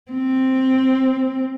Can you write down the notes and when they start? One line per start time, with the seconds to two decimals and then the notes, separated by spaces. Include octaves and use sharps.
0.11 C4